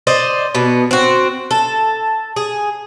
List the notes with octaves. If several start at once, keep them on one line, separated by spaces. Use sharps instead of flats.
C5 D5 D#5
B2 B3
C4 F#4
A4
G#4